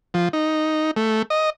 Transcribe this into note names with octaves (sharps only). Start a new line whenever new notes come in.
F3
D#4
A3
D#5